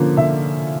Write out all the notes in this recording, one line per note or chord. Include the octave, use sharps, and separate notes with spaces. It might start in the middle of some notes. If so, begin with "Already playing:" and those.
Already playing: D3 F3 A#3 C#4
D3 E5